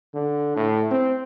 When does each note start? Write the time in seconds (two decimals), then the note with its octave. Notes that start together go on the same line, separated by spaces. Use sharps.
0.14 D3
0.57 A2
0.91 C4